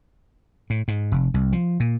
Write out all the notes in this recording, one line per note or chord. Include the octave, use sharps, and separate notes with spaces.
A2
G#2
F1
C2
F3
A#2